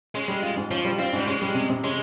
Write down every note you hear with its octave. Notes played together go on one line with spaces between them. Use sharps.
G#3 C#4
G3
F4
G#2
F3 C#4
G3
C4 F4
G#2 G3
G#3 C#4
G3
C3
C3
G#3 C#4